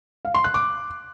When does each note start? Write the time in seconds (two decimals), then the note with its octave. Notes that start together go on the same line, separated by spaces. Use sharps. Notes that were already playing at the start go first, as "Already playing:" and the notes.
0.25 F5
0.34 C6
0.44 F#6
0.54 D6